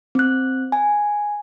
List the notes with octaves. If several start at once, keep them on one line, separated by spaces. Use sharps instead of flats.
C4 F#6
G#5